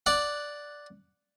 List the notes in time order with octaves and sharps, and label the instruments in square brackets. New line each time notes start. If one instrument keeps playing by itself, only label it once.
[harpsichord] D5 F#5